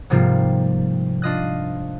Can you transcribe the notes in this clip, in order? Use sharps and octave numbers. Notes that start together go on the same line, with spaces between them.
G#2 C3 F3 G3 A#3 F4
D4 F4 D#5 F#6